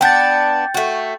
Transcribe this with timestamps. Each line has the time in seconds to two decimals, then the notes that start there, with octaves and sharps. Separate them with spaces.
0.01 B3 D4 G5 G6 A6
0.74 A3 F#4